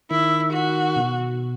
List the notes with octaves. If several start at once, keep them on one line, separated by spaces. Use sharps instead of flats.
D#3 E4
F#4
B2